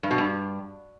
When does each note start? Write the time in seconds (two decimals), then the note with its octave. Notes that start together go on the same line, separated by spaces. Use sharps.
0.03 G2
0.11 B2
0.18 G2